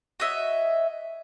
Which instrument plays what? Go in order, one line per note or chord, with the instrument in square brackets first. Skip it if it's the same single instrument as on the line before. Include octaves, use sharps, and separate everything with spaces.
[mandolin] F#4 C#5 D#5 E5